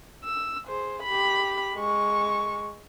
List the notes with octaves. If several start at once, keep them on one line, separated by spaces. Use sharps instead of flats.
E6
G#4 C5
G4 B5
G#3 C#6